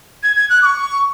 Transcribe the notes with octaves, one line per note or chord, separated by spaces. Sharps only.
G#6
G#6
F#6
D6
C#6